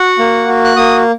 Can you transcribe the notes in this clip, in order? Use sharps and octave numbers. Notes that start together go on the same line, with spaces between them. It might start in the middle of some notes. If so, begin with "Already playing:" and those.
Already playing: F#4 F#5
A#3
F#4
F#6
A#3 D#6